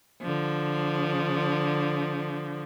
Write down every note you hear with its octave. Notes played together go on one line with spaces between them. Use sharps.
D3 F3